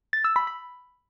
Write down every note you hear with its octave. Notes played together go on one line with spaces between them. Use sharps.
A6
E6
B5
B5